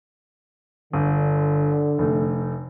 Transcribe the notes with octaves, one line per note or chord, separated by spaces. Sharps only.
G1 D3
F1 A3